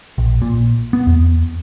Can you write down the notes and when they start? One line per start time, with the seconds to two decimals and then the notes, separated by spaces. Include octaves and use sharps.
0.18 A#1
0.42 A#2
0.93 B3
1.07 E2